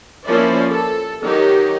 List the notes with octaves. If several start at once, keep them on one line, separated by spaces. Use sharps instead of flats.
F3 A#3 C#4 E4 C5 D5
A4
D#3 F#3 D#4 G4